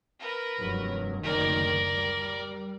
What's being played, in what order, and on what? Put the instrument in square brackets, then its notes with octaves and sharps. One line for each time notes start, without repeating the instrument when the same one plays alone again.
[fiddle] A#4 B4
[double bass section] F1 G2 F#3
[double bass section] F#1 D2 D#3 [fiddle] A#4 D5
[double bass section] G3